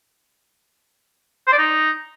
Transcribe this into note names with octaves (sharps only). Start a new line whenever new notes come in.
C5
D5
D#4